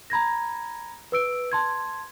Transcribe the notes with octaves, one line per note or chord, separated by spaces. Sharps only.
A#5 B5 G#6 A#6
B4 E6 D7
A5 C6 G#6